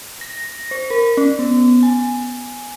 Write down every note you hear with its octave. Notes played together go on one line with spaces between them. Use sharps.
A#6
C5
A#4
C#4
B3
G#5